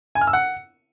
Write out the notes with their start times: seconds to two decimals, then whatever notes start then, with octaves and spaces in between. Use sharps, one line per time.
0.15 G#5
0.21 F6
0.27 E6
0.33 F#5